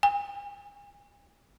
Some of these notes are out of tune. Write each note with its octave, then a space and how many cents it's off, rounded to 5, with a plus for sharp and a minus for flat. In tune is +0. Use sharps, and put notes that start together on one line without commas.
G#5 -35